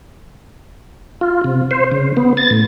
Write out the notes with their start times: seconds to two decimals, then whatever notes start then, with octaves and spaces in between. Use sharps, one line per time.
1.21 F4
1.44 C3
1.71 C5
1.92 C#3
2.17 B3
2.37 A6
2.50 A2